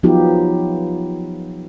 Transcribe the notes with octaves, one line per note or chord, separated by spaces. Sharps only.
F3 F#3 B3 D#4 F4 G4